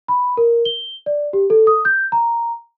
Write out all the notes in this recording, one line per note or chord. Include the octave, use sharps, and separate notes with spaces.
B5
A#4
G7
D5
G4
A4
D#6
G6
A#5